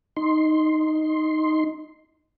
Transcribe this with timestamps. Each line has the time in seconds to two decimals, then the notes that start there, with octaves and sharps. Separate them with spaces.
0.17 D#4 C6